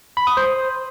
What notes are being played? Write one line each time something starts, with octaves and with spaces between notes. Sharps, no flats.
B5
D#6
C5